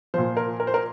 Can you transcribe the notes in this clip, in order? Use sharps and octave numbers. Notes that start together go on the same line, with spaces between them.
A#2 F3 C5
A#4
A#4
C5
A#4